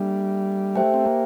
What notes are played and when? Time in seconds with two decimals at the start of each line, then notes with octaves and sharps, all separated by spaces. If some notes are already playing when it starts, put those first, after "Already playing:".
Already playing: G3 A#3 D4 A4 E5
0.75 A3 G4 C5 E5 G5
0.94 C4
1.06 A#3